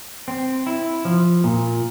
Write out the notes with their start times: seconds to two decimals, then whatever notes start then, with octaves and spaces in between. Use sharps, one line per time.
0.28 C4
0.67 E4
1.05 F3
1.44 A#2